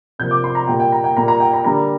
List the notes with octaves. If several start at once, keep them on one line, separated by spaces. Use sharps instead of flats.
C3 F3 A#3 G6
D6
C6
A#5
A#2 G3 A#3 G5
G5
A#5
G5
A#2 G3 A#3 A#5
A#5
G5
A#5
D3 G3 A#3 A#5